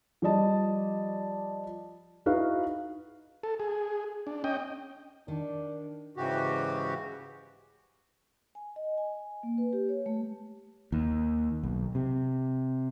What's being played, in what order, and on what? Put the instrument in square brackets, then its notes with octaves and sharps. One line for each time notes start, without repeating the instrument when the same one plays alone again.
[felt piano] F3 G3 D5 D#5 A5
D#4 E4 F#4 B4 F5
[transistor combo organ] A4
G#4
D4
C#4 D#5 G5
[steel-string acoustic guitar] D#3 [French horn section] D4
[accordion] G#2 C#3 E3 F#4 G4
[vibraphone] G#5
D#5
G#5
A#3
B4
G4
C#5
A3
[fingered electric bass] D#2
B1
C3